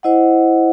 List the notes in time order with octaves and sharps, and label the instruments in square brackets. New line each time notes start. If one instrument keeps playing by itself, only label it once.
[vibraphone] E4 C5 D#5 F#5